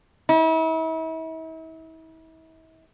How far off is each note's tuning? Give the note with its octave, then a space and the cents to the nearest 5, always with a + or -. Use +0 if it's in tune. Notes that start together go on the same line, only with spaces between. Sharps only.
E4 -40